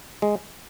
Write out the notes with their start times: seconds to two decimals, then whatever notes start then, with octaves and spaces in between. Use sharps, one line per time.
0.22 G#3